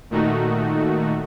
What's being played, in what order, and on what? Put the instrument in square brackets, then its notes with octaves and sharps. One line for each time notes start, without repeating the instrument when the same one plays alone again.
[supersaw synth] A#2 D#3 A3 D#4 F#4